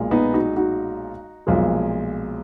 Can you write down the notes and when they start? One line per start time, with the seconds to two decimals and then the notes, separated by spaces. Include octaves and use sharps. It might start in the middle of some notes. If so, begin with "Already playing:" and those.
Already playing: B1 A#2 G#3
0.11 B3 D#4
0.33 D#4 F#4
0.56 D#4 F#4
1.47 B1 A#2 F3 G#3